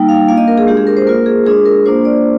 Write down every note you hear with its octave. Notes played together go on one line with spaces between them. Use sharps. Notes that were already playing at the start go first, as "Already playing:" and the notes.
Already playing: G3 A#3 D#4 G5
F5
A#3 D4 F4 F5
D#5
A#4
G#4
G#3 D4 F4 G4
G#4
A#4
C5
A#3 F4 A#4
G#4
G#3 D4 F4 G#4
A#4
A#3 D4 F4 C5
D5